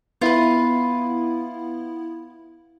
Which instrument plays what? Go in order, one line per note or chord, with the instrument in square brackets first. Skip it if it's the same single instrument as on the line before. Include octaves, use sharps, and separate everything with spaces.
[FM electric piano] B3 E4 [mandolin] F4 B4